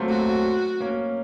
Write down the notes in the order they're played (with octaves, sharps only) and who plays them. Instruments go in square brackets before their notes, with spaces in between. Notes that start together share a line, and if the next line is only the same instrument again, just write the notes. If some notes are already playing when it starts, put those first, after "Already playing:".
Already playing: [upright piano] F#3 A3 A#3 C4
[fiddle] F#4
[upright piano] A#3 C#4